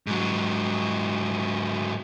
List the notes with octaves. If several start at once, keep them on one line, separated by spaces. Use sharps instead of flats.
G#2 F#3